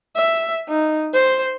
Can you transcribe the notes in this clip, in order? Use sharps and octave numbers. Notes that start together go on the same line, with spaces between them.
E5
D#4
C5